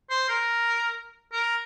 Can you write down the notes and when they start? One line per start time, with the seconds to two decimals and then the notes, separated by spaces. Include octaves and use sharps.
0.10 C5
0.29 A#4
1.32 A#4